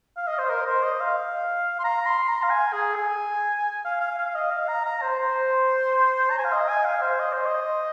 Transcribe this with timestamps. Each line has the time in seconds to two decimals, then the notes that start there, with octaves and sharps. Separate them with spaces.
0.17 F5
0.27 D#5
0.38 C5
0.50 A#4
0.66 C5
0.83 D#5
1.00 F5
1.79 C6
1.84 A#5
2.06 C6
2.28 A#5
2.43 F5
2.50 G#5
2.73 G#4
2.95 G#5
3.85 F5
4.01 F5
4.18 F5
4.35 D#5
4.51 F5
4.68 A#5
4.85 A#5
5.02 C5
5.19 C5
6.31 A#5
6.38 G#5
6.45 F5
6.52 D#5
6.69 G#5
6.85 F5
7.02 C5
7.20 D#5
7.33 C5
7.46 D#5